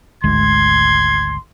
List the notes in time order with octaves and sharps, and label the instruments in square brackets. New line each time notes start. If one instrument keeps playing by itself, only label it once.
[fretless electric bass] G#1 D2 G#3 [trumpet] C6 [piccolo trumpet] G#6